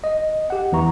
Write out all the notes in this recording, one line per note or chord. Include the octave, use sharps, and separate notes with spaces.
D#5
G4 F#5
E2 E3 A#5 C#6